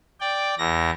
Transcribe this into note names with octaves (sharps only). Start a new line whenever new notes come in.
D5 G5
E2 A#6